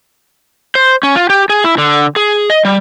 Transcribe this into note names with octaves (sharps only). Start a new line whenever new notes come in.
C5
C#4
F4
G4
G#4
E4
D3
G#4
D#5
G3